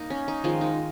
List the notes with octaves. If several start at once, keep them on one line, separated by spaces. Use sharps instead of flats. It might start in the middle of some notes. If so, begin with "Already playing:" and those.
Already playing: A#3 D#4
C#4
D#4
D#3 F3 G#3 F4
D#4